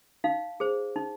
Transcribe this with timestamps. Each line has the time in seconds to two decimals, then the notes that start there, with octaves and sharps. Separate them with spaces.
0.24 D#4 F5
0.60 G#4 C5
0.96 D#4